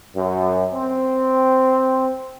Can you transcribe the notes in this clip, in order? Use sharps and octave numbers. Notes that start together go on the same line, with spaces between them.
F#2
C4